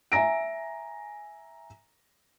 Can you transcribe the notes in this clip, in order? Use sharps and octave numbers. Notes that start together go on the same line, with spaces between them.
E5 G#5 A#5 A#6 D7